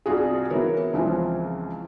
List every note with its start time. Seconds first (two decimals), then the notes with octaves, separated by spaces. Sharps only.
0.06 C2 F4 F#4 G#4
0.50 E3 B3 F#4 A#4 C#5
0.93 C#2 E3 F3 C4 G#5